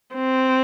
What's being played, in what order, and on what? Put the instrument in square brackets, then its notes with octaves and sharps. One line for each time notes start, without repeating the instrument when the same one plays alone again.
[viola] C4